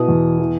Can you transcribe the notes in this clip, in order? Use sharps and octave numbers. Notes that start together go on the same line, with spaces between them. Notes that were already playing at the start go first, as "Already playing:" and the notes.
Already playing: B2 E4 D#6
E2
E3